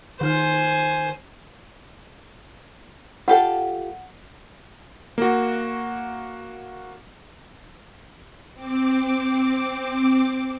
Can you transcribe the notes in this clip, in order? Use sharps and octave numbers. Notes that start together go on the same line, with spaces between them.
D#3 D#4 C5 G#5 F6
F4 G4 A4 F#5
A#3 F#4
C4 D6